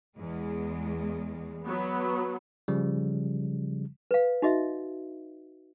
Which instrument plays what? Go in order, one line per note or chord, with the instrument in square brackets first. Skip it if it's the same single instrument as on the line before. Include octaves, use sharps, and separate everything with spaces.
[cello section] E2 G#3
[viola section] F#3 B3
[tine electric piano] C#3 F3 G3
[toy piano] B4 F5
D#4 F#4 D#5 E5